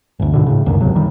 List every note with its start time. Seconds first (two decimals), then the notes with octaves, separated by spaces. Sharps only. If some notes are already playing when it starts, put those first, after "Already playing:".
0.20 G1 D2
0.34 G#2 B2 D3
0.47 A2 C#3
0.66 C#2 F#2 D3 D#3
0.80 G#1 D#2 C3 F#3
0.95 D#3 G3